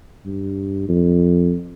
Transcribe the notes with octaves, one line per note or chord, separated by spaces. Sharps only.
G2
F2